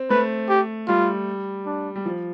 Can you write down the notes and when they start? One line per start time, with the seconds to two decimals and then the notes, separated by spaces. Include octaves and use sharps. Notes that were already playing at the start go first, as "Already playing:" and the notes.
Already playing: C4
0.10 A3 B4
0.49 G4
0.88 G3 F4
1.66 D4
1.96 G3
2.06 F3